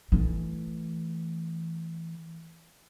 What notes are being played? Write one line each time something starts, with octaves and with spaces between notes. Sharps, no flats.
E3 A3